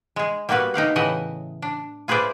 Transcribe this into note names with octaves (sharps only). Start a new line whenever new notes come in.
G#3 G#4
G3 A#3 B3 F#4 B4
D#4 G4 F5 F#5
A2 C#3 E3 D#5 E5 F#5
D4
F4 G#4 B4 C5 D5 E5